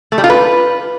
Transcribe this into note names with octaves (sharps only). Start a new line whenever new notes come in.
A3
G3
F4
B4